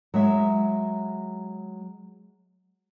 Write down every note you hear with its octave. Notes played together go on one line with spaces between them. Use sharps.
F#3 G#3 E5